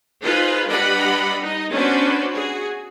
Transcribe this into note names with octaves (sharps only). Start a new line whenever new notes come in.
D#4 F4 G#4 B4 C5
G3 D4 B4 D#5 F#5 B5
D#4 D#5
B3 C#4 D4 F#4 B4 C5
F#4 G#4